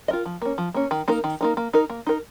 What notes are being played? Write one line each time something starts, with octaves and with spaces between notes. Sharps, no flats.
F4 A#4 D#5
F3
A#3 C#4
F3
A#3 C#4
D#3
A#3 D#4 A#4
D#3
A#3 D#4 A#4
A#3
D#4 A#4
A#3
D#4 A#4